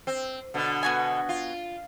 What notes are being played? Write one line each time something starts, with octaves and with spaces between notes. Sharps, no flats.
C4
B2 D3
B3 F#4 G#5
F4